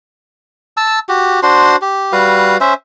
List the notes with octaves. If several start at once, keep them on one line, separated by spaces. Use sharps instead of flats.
A5 E6
F#4 G4
D4 F#4 C5 C6
G4
G3 F#4 B4 F5
C#4 C5 E5